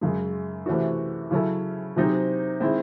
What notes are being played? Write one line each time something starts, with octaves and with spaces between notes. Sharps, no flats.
F#2 C#3 G#3
C3 E3 A3 C#4 F#4
C#3 F#3 C#4 E4 A4
C3 F#3 C4 D#4 G#4
D#3 G#3 C4 E4